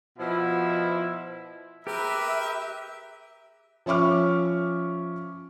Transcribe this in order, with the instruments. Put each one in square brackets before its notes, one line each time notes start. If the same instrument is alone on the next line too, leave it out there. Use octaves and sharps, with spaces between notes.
[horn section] B2 F3 E4
[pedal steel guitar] G4 [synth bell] G#4 [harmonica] A#4 B4 [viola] E5
[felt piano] F3 C#4 E5 C#6 D6 F6